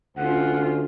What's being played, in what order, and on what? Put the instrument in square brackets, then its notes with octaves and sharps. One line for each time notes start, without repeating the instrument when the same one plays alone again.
[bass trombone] D2 [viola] C4 F4 [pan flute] C#4 [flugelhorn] F#5